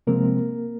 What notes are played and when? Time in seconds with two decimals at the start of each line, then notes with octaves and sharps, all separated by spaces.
0.07 C3 F3 G#3 A#3 C4 A#4